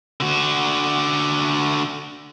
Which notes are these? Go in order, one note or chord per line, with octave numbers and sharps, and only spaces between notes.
D3 F#4